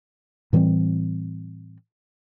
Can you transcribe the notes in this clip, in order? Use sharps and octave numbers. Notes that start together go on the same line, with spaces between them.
A2 E3 G3 C4